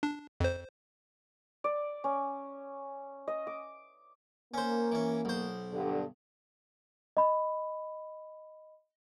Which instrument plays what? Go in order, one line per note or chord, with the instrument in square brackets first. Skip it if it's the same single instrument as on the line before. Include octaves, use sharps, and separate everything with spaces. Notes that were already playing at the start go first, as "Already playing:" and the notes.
[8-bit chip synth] D4
F2 C5
[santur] D5
C#4
D#5
D6
[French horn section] A#3 [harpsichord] C#4 C5
[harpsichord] E3 C#4
B1 C5
[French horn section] G2 D3
[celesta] D#5 B5